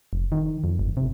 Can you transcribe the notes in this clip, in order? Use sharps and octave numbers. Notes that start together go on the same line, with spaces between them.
F1
D#3
F2
G1
C3